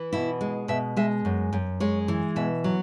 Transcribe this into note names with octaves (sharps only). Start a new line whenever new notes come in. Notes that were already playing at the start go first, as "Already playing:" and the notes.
Already playing: E3
B2 E4
G#3
B2 E5
G#3 E5
F#2
F#2
G#3 C#5
E3
B2 E5
F#3